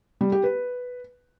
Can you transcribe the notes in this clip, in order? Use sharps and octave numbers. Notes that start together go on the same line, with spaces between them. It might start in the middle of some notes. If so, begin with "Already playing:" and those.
G3
G4
B4